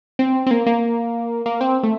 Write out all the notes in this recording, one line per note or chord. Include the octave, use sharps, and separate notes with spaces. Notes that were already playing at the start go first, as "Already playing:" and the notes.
C4
C4
A#3
A#3
A#3
C4
A3